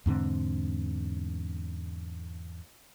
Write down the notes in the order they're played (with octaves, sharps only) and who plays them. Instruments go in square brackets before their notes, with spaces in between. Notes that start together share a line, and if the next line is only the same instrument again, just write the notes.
[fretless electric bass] E2 G#2 D3 C4